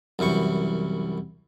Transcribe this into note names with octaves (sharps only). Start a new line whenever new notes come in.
C2 F#2 E3 C#6